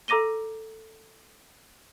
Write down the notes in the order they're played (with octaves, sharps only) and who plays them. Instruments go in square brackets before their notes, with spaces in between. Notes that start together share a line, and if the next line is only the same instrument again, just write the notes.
[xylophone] A4 A#5 D6 A#6 D#7 G7